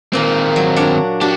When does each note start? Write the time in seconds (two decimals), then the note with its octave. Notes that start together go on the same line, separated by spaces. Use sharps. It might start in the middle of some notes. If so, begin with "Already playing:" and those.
0.13 A#2 D#3 A#3 C4
0.56 F#3
0.76 D4 C#5 F#5
1.21 D4 F#4 G4